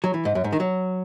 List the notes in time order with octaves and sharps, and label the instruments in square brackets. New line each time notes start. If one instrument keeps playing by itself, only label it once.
[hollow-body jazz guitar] F#3
E3
G#2
F#2
G#2
D#3
F#3